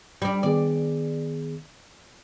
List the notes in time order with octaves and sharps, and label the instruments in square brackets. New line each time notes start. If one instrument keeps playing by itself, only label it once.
[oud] G3 D4 [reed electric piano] G5
[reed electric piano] D#3 B3 G#4 [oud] D5